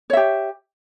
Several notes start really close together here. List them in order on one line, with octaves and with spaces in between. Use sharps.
C#5 E5 G4